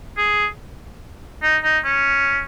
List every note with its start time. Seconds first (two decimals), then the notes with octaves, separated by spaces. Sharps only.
0.17 G#4
1.43 D#4
1.64 D#4
1.84 C#4